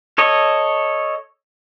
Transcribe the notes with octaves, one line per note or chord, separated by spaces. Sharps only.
A4 C#5 D#5